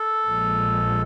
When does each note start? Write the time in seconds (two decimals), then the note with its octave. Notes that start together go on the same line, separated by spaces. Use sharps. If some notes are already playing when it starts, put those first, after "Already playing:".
Already playing: A4
0.27 A#1 A#2 F3 G#3